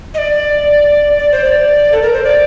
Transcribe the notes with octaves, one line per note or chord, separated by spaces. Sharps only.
D#5
D5
D5
C5
D5
A4
A#4
C5
D5